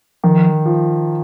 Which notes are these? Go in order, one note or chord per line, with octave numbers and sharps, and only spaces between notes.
D#3 F3
F3